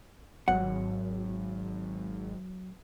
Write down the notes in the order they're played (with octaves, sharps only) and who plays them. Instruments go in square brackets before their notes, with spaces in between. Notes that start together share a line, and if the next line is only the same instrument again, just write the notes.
[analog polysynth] G#1 [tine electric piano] F#3 [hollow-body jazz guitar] F#5